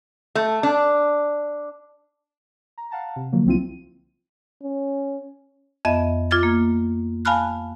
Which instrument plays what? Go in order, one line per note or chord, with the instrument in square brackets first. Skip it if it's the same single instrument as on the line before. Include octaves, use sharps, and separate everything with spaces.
[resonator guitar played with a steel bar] A3
D4
[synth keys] A#5
F5 F#5 A5 A#5
C3
D3 F3 F#3 A#3
C2 F3 C4 E4 F4 D#7
[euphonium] C#4
[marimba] F2 B3 D#5 E5
F4 D6 F6 G#6 A6
A#3
F5 G#5 A5 B5 F6 F#6